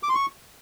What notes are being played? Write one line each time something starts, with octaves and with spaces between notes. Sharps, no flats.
D6
C6
C#6